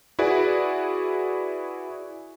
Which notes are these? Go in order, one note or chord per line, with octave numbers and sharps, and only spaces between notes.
E4 F#4 G#4 B4 D5